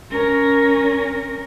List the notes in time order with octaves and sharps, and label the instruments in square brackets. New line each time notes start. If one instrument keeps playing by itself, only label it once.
[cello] C#4 A#4